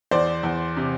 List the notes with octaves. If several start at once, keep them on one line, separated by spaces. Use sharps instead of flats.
E2 C5 D5
E2
C3